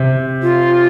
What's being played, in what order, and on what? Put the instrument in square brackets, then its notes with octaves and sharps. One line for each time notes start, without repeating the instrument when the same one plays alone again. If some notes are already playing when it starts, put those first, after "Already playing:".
Already playing: [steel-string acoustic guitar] C3
[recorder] F4